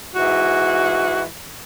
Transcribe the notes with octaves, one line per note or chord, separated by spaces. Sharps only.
G#2 E3 F#4